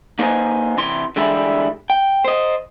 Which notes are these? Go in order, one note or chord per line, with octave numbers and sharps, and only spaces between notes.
A#3 D#4 B4 C5 D#5 G#5
C3 E3 C6
D3 E3 G3 G#3 E4
G5
C5 D#5